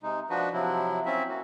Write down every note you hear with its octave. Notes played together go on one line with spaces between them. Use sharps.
C3 G#3 D#4
F3 D4 F#4 B4
C3 F3 F#3 E4
C4 C#4 E4 E5
A#3 F#4